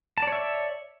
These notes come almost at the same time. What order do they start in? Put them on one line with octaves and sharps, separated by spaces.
A5 D5 C#5 E5